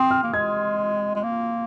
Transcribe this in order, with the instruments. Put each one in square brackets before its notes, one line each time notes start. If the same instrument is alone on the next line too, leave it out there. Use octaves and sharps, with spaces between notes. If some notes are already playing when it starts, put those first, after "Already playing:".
Already playing: [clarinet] C4 [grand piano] C6 D#6
[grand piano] F6
[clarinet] A#3
[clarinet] G#3 [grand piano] G#6
[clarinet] G#3
A#3